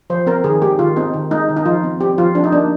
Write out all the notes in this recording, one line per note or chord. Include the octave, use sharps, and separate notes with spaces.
F3 C5
C4 A#4
D#3 G#4
G#3 G4
D#3 F4
C4 D#4
D#3
G#3 D#4
D#3
D#4
F3 F4
C4
C4 G4
F3 F4
F3 D4
D#4
A#3 D4